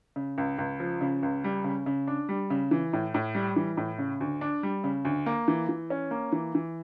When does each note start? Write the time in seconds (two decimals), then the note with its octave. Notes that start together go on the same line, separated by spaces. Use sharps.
0.16 C#3
0.38 C#2
0.59 C#2
0.80 F3
1.01 C#3
1.23 C#2
1.44 G3
1.64 C#3
1.86 C#3
2.07 D4
2.29 G3
2.50 C#3
2.71 E3
2.93 A2
3.14 A2
3.35 G3
3.56 E3
3.77 A2
3.99 C#3
4.20 D2
4.41 D4
4.63 G3
4.84 C#3
5.05 D2
5.26 A#3
5.48 E3
5.69 E3
5.90 C#4
6.11 A#3
6.32 E3
6.55 E3